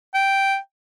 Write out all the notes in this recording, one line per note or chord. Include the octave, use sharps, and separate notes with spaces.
G5